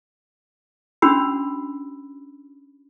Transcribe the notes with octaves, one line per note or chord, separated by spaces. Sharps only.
C#4 D4 F#4 B5 E6